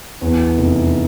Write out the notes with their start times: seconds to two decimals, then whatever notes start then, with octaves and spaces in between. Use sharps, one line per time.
0.21 E2
0.58 F1